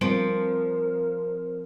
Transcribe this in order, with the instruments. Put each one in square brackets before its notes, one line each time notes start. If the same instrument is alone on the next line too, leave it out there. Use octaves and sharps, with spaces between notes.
[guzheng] F3 [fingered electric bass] G3 [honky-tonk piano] C4 D7 F#7 [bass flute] A#4